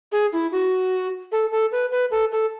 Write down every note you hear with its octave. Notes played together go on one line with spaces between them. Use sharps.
G#4
E4
F#4
A4
A4
B4
B4
A4
A4